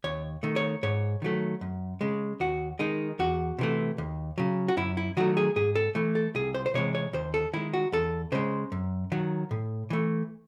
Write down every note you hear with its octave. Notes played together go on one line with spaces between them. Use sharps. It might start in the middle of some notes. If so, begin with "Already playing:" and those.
D#2 C#5
D#3 A3
C#5
G#2 C#5
D#3 F#3 A3
F#2
C#3 G#3
D#2 F#4
D#3 G#3 D#4
E2 F#4
C3 E3 A3
D#2
C#3 F#3
F#4
F#2 E4
E4
D#3 F#3 A3 F#4
G#4
G#2 G#4
A4
E3 A3
A4
C2 G#4
C5
C5
C3 E3 G#3 C#5
C#5
D#2 C5
A4
D#3 G#3 E4
F#4
E2 A4
C#3 G#3 C5
F#2
D#3 F#3
A2
E3 A3